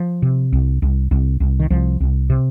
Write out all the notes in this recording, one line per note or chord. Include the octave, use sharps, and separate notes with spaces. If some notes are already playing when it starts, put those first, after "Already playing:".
Already playing: F3
C3
C2
C2
C2
C2
D#3
C2 F3
C2
C3